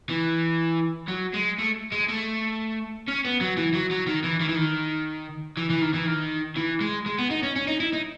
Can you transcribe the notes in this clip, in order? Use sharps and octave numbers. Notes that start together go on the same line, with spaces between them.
E3
F#3
G#3
A3
G#3
A3
C#4
B3
F#3
E3
F#3
F#3
D#3
E3
D#3
E3
D#3
E3
E3
D#3
E3
D#3
E3
G#3
G#3
B3
D#4
C#4
C#4
D#4
E4
D#4